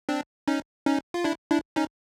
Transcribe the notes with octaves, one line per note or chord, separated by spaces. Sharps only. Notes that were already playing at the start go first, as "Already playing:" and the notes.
C4 D4
C#4 D#4
C#4 D#4
F4
D4 E4
D4 E4
C#4 D#4